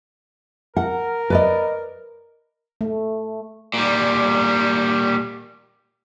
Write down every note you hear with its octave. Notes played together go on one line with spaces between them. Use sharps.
A#4 F#5
B4 D5 D#5
A3
A#2 G3